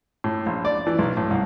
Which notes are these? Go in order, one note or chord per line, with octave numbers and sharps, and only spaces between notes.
A2
A#1
D5
E3
B1
A2
C2